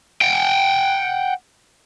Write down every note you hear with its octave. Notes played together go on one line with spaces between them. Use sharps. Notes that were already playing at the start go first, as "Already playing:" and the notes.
F#5 G5